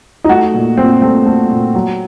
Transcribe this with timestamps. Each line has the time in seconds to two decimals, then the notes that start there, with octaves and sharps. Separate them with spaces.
0.24 D#4
0.29 A3 F#4
0.54 A#2
0.78 A#2 C4
1.02 A3 C4
1.26 A3
1.50 A#2
1.74 F#3